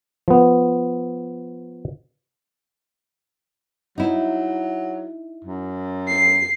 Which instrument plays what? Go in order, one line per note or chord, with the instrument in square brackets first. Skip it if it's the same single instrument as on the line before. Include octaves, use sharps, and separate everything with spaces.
[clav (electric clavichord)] F3 B3
[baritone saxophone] F#3 [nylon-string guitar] D#4 E4
[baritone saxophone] F#2
[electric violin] C7